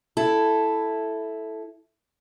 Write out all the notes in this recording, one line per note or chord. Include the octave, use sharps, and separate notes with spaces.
E4 A4